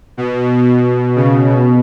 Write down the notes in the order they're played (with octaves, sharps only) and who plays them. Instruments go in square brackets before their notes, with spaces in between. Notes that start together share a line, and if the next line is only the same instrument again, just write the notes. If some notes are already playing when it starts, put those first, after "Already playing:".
[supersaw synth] B2
C#3
B2